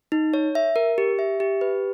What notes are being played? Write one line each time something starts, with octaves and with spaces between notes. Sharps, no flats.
D#4
C#5
E5
A#4
G4
E5
G4
B4